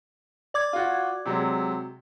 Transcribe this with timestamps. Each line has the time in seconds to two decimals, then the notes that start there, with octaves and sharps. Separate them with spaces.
0.54 D5 D6 G#6
0.73 F4 F#4
1.25 C3 F#3 G#3